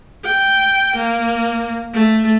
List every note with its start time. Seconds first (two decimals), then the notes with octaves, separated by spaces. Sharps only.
0.25 G5
0.96 A#3
1.94 A3